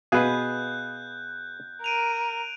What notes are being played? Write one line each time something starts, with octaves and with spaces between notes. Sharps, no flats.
B2 G#4 B4 F5 F#6 G6
A#4 D7 D#7 F7